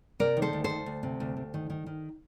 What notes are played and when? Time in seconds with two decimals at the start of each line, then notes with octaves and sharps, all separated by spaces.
0.19 C3 A#4 D5
0.37 D#3
0.42 A4 C5
0.53 D2
0.64 A4 C5
0.70 D2
0.86 D2
1.03 C3
1.20 D2
1.37 D2
1.54 D#3
1.70 D#3
1.86 D#3